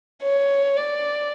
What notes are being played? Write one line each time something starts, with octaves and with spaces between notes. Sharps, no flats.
C#5
D5